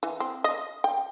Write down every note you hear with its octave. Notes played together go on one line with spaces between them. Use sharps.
E3
C4
D#5
G5